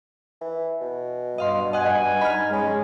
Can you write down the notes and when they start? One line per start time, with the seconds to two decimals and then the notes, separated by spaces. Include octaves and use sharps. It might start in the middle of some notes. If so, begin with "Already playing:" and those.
0.41 E3
0.81 B2
1.38 G2 D#5 F5 C6
1.73 D#5 F#5 G#5 F#6
2.21 D#4 B5 F6
2.53 G#3 C#4